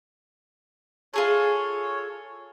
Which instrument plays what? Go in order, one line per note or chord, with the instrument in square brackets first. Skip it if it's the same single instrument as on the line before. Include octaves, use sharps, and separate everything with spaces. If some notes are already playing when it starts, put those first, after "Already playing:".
[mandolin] F4 G#4 A4 [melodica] C#5